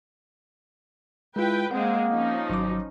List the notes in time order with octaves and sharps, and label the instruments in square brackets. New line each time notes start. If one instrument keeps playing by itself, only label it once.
[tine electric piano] G#3 F4 [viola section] E4 B4 G5
[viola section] G#3 C4 G#4 [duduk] A#3 [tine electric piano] F#5
[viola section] F3 C#4 D#4
[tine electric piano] G#1 F#3 D6